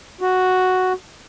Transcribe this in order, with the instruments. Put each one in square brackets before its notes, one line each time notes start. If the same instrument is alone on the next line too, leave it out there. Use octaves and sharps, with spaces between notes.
[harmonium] F#4